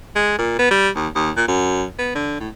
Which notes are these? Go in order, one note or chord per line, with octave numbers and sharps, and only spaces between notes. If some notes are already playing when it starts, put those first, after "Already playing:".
G#3
A#2
B3
G3
D#2
D#2
A#2
F#2
B3
D3
A2